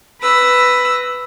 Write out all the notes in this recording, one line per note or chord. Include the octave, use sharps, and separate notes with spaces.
B4 E6 A#6